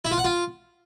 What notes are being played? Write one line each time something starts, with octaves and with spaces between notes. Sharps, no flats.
E4
F4
F#5
F4